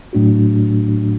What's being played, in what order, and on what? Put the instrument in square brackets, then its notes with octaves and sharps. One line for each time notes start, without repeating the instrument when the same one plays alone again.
[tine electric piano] A2 F#3 A3 D4 F#4